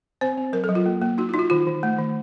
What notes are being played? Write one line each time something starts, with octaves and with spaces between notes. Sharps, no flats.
C4 C5
C4
F#3 A#4
A4
F#3
F4
A#3
A#3
D#4 F#4
F4
D#4
F4
D#3 F4
D#3
A3
D#3